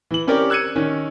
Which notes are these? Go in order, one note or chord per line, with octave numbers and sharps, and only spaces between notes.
E3 F#7
C4 C#4 G4 A#4 D5
E6 F#6 G#6 C#7 D#7
D#3 C#4